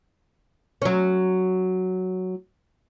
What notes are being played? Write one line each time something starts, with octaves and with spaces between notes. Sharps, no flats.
F#3 C#4